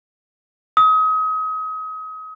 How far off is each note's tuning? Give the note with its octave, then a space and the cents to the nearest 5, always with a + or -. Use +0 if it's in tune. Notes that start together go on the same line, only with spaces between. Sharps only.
D#6 +30